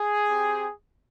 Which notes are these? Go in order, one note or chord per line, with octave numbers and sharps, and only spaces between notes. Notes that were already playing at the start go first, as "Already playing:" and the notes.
Already playing: G#4
C4 G4